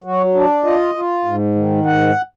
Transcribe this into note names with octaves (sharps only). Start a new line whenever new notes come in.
F#3 F#4
D4
F4 D#5
F4
G#2
D#3
G#2 F#5